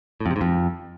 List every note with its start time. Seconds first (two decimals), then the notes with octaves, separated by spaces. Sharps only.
0.21 A2
0.26 F2
0.31 C3
0.36 G#2
0.41 F2